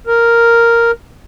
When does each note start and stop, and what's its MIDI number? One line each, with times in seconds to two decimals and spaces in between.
0.07 0.91 70